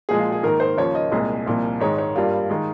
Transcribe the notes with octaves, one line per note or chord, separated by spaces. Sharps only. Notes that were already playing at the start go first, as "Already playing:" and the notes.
A#2 F3 G#3 G#4
F4
G#4
G#2 D#3 A#3 A#4
C5
D#2 C#3 F3 A#3 C#5
D#5
C2 A#2 G#3
C2 A#2 F3
G#2 D#3 G#3 C#5
C#5
G2 G3 A#3 F4
D#3 G#3